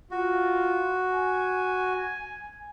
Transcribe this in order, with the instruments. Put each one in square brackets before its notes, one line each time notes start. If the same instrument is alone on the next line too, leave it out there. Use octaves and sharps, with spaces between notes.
[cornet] F4 [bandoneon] F#4
[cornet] G#5